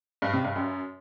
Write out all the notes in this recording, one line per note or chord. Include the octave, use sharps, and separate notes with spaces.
G2
C3
G2
F#2